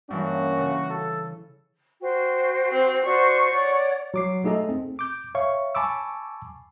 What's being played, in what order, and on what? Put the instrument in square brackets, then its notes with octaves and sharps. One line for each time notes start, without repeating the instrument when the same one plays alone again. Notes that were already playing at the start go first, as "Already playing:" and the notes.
[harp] G2 E3 [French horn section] A#3 C#4 [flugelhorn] F#4
[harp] C#3
[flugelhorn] A4
[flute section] F#4 C5 G5
[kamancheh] C4
[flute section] F#4 C5 D5 [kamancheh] C#6
[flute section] C#5 D5 F#5
[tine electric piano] F#3 D6 C7
A3 D#4 G#4 A4 D#5
C4
D6 G6
C#5 E5 F5 C#6
G#5 A5 B5 C#6 D6 E6